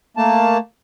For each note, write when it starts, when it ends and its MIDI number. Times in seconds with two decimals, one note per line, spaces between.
0.17 0.57 57
0.17 0.57 58
0.17 0.57 81